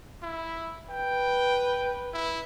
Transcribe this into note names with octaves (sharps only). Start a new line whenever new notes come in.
E4
B4 G5
E4